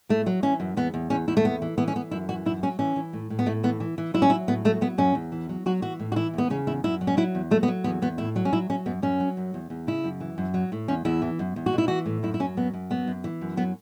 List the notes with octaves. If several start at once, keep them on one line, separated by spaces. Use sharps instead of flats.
A2 A3
F#3
E3 C#4
F#2
E2 B3
E2
E2 C#4
E2 E4
A3
E3 B3
E3
E3 B3
C#4
E3 B3
F#2 E4
E3 F#4
F#2 E4
F#3 C#4
E3 C#4
E3
A2
A2
B3
A2 A3
E3 B3
E3
E3
F#3 E4
C#4
F#3 E4
A2 B3
F#3 A3
F#3 B3
F#2 C#4
E2
E3
F#3
F#3 F#4
E3 F#4
A2
F#4
E3 E4
E2 B3
C#3 C#4
E2 E4
F#2 E4
F#3
C#4
F#3 E4
E2
F#3 A3
B3
F#3
E2 B3
E2 B3
A2 E4
F#3
C#4
F#3 E4
F#3 C#4
F#2 B3
F#2 C#4
F#3
F#2
E2
E2
C#3 E4
F#2
E3
F#2
F#3
A2
E2 C#4
E2 E4
E3
F#2
E2
F#4
B2
E4
E3 F#4
A2
F#2 E4
E4
F#3 C#4
F#2 B3
F#2
F#3 B3
F#2
E3
F#2
F#3 B3